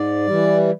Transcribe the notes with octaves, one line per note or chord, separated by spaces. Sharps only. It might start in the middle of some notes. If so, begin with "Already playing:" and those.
Already playing: G#2 D5
E3 G3